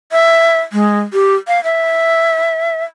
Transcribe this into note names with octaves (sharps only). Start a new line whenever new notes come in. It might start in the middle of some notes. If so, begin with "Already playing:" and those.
E5
G#3
G4
F5
E5